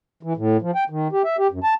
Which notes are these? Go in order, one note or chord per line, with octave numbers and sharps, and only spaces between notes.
E3
A2
F3
G5
D#3
G4
E5
G4
F#2
A5